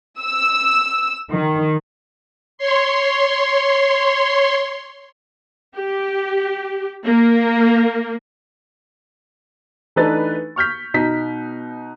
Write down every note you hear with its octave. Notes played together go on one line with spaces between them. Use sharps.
E6
D#3
C#5 C6
G4
A#3
E3 A3 D4 D#4 B4 A6
C#6 F6 G6 B6
B2 D#4 B6